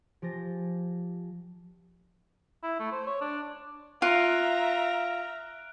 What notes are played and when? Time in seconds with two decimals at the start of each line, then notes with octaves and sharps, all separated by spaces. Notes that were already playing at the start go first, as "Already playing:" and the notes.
0.22 F3 G4 G#5 G6 A6 A#6
2.63 E4
2.80 A3
2.92 C5
3.07 C#5
3.21 D4
4.02 F4 E5 A#5 F6 F#6 D7